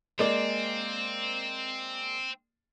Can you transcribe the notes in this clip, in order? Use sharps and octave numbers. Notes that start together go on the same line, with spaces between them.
G#3 A#3 C4 D5